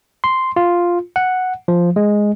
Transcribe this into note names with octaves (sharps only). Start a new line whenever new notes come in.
C6
F4
F#5
F3
G#3